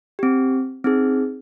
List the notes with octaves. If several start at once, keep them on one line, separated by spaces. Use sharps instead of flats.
C4 G4
C4 D#4 G#4